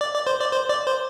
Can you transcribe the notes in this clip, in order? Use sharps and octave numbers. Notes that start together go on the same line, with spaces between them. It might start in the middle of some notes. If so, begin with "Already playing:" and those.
D5
D5
C5
D5
C5
D5
C5